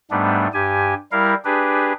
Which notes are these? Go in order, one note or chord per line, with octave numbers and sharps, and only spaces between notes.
G#2 G3 A3 B3 D4
G2 G4 G#5
G3 E4 A#4 F5
D4 G4 G#4 B4